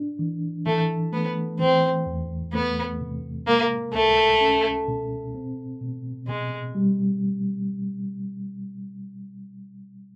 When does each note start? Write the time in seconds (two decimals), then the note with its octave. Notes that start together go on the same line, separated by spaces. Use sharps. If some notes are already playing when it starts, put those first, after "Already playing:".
Already playing: D4
0.19 E3
0.66 E3 A3
1.13 A3 B3
1.60 E3 C4
2.06 E2
2.54 A3 B3
3.01 C3
3.47 G#3 A#3
3.94 C#2 A3
4.41 C#4
4.88 B2
5.35 C4
5.81 B2
6.28 B2 G#3
6.75 G3